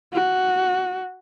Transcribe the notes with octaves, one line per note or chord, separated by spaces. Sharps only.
F#4